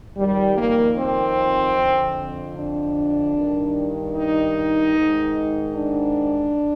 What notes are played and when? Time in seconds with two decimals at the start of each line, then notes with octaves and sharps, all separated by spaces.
0.17 F2 D#3 G3
0.57 A#3
0.97 C4
1.77 F2 D3
2.56 D4
3.36 G2 D#3
4.16 D#4
4.96 G#2 D#3
5.75 D4